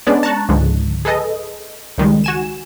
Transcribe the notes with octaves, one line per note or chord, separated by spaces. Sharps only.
G#3 B3 C#4 D4 D5
A5 A#5 C#6 F#6
C#2 G#2 D3 F3 G#3
G#4 A4 B4 D#5
C#2 D#3 G3 G#3
F#4 G#5 E7